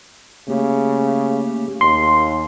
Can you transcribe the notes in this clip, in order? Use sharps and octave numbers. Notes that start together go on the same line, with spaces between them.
C#3 A3 A#3 G4
D#2 C6